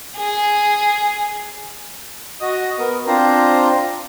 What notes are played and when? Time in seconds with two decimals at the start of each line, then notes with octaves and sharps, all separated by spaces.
0.17 G#4
2.40 F#4 D#5 D#6
2.79 B3 A#4
3.07 C4 D4 F4 C5 A#5